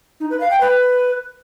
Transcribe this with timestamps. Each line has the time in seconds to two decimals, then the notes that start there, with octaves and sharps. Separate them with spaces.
0.20 D#4
0.30 B4
0.40 F5
0.51 G5
0.61 B4